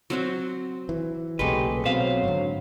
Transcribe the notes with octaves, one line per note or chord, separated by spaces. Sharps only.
F#3 C4 F#4
E3
B1 A#2 C#3 G#3 A3 G4 B4
B2 F#3 B3 C4 C5 F5 B5
G#2 D3